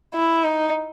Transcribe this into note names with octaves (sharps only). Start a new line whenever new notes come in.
E4
D#4